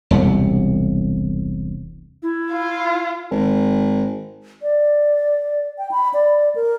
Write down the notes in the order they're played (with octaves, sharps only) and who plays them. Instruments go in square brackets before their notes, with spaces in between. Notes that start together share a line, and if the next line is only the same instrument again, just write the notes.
[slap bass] E1 C2 C3
[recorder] E4
[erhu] F4
[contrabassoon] G#1
[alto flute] D5
G5
B5
D5
A#4